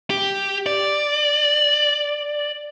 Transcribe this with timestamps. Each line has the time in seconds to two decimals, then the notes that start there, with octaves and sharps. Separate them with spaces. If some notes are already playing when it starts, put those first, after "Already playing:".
0.10 G4
0.66 D5